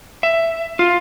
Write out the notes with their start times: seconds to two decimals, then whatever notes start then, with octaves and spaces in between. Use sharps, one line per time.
0.23 E5
0.79 F4